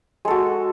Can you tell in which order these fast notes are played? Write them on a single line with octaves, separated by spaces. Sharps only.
G#3 A4 F#4